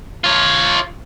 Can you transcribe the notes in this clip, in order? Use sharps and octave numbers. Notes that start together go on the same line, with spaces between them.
F4 C#5